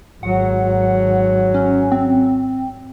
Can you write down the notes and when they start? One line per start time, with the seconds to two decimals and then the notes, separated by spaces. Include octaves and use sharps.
0.23 G#1 F#3 F#5
1.54 C#4
1.92 C4